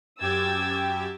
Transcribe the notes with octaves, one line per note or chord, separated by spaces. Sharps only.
F#2 G4 G5 E6 G#6 A6